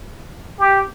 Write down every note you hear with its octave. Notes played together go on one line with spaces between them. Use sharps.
G4